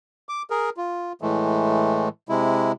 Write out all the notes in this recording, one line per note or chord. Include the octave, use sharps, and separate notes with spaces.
D6
G#4 A#4
F4
A2 E3 G#3 A3
C3 G#3 E4